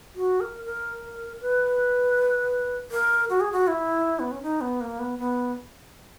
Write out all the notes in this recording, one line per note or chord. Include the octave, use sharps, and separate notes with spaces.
F#4
A#4
A#4
B4
A#4
F#4
G#4
F#4
E4
B3
C#4
D#4
B3
A#3
B3
B3